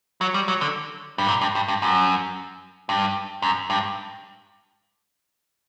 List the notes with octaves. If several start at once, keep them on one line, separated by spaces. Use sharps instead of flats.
F#3
G3
F#3
D3
G2
A#2
G2
G2
G2
F#2
G2
F#2
G2